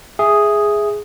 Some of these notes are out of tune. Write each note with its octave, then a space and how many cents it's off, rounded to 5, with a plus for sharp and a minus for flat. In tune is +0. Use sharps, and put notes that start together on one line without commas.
G#4 +0 E5 +0